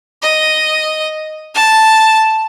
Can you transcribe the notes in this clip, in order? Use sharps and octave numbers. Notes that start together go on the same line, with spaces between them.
D#5
A5